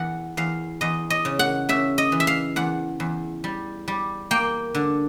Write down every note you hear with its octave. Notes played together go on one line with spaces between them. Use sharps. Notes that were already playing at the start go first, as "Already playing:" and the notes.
Already playing: E2 F#5
E2 F5
E2 D#5
D#5
C#3
F#5
C#3 E5
D#5
E3
E5
F5
E2 F#5
E2
G3
G3
A#3 G5
D3